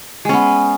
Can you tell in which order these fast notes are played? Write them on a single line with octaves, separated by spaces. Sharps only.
G#3 C#4 B3